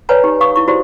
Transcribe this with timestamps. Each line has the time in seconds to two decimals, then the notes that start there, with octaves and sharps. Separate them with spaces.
0.09 B4 C#5 D5 F#5 G#5 A#5
0.24 D#4 G4
0.41 F5 C#6 D#6
0.56 E4 C#6
0.67 E4 F#4 G4 C5 D5